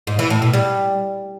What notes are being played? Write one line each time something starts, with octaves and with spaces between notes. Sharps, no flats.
G#2
E3
A2
B2
G3